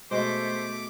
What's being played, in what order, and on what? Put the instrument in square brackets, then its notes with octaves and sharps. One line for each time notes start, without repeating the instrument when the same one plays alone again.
[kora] B2 G#3 [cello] A3 [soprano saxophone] C5 [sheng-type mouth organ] D6